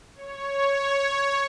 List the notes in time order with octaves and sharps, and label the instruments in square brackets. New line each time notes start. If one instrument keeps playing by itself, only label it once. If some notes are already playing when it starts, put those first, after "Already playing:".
[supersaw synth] C#5